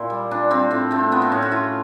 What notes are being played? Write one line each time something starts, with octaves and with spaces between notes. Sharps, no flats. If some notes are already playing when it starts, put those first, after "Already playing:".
Already playing: A#2 E4
G3
A#2 D4
G3 C4
A2 C4
A3 C4
F3 B3
C4
A2 C#4
F#4
A2 F4